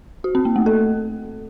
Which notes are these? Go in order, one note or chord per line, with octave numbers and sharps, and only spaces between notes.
F#4
C4
A#3
A3
A4